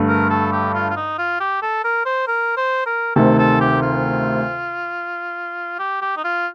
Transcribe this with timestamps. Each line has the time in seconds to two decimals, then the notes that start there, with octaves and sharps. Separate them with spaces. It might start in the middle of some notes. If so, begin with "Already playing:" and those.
Already playing: G2 D3 A3
0.08 A#4
0.30 A4
0.52 G4
0.75 F4
0.90 F4
0.97 D#4
1.18 F4
1.40 G4
1.62 A4
1.84 A#4
2.06 C5
2.28 A#4
2.57 C5
2.86 A#4
3.16 D2 C3 D#3 A4
3.39 A4
3.61 G4
3.82 F4
5.79 G4
6.02 G4
6.17 D#4
6.24 F4